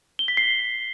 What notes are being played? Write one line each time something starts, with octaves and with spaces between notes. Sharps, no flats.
G7
B6
C7